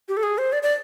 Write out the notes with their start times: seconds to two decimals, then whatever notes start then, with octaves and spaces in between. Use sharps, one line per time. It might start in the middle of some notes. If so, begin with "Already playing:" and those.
0.08 G4
0.17 A4
0.23 G#4
0.38 C5
0.52 D5
0.63 D5